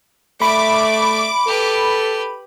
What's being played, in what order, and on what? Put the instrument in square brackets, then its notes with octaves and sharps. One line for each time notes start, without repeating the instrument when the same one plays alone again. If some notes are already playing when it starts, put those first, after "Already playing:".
[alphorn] A3 [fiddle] D5 E5 [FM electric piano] B5 [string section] D6
[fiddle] G4 B4 [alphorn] A4